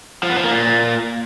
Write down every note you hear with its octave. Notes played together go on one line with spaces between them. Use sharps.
F3
B3
F3
A#3
A#2